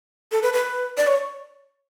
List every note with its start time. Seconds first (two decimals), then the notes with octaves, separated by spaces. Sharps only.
0.32 A4
0.43 B4
0.53 B4
0.97 D5
1.07 C#5